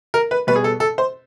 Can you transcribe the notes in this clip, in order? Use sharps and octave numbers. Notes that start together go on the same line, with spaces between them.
A#4
B4
B2 G3 B3 B4
G#4
A4
A4
C5